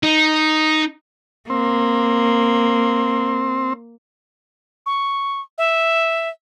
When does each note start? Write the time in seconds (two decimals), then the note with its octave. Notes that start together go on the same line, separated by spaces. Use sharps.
0.03 D#4
1.50 A#3 C4
4.86 C#6
5.58 E5